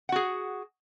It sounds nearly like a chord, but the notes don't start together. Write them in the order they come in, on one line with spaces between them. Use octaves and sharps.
F#5 F#4 G#4